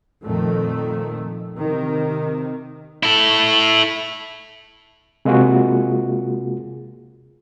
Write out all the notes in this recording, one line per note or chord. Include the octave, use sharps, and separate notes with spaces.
F2 A#2 D#3 A3
C3 D#3
E4 A4
C3 G#3 A#3 F4 F#4 G#4